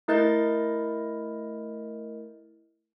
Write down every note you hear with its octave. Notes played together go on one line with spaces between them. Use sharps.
A3 E4 A#4 D#5 G6 A6